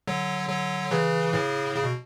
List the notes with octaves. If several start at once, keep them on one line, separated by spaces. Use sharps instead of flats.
D3 F#3
D3 F#3
C#3 E3
A2 C#3
C#3
B2